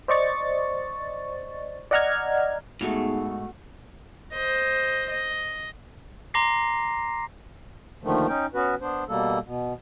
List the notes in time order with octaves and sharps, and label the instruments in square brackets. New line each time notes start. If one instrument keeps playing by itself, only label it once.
[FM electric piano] C5 D5 D#5 C#6 A6
D5 D#5 F#5 A#5 F6 G#6
[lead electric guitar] G#2 [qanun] A3 F#4 F5 [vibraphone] B3 D#4 G#4
[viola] C5 D#5
D#5
[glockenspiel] A#5 C6 D6 A#6 C7
[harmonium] D#2 D3 D#3 F3 A3
C#4 D#4 G5
B3 C#4 F#4 B4
B3 D4 C5
B2 G3 A#3 A4
B2